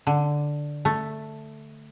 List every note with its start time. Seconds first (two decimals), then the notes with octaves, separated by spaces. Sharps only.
0.07 D3
0.85 A3